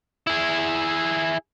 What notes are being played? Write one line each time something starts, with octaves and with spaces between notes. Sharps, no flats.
E4 G#4